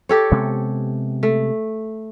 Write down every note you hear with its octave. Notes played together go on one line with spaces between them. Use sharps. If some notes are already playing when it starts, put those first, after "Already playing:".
G4 A4 C#5
C3 G#3 B3
A3